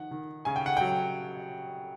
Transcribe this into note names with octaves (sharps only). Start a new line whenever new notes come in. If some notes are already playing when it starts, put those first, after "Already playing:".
Already playing: D#3 F3 F#5
D#3
C#3 G#5
G5
F#5
F#3 G5